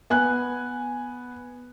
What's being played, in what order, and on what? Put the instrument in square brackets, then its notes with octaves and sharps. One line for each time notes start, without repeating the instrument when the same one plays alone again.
[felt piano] B3 G#5 F#6